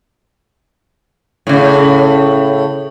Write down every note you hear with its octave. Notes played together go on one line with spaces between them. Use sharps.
A2 C#3